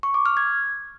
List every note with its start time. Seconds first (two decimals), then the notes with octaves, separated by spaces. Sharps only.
0.03 C#6
0.14 D6
0.26 F6
0.37 G#6